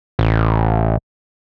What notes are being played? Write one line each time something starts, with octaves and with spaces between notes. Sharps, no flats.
A1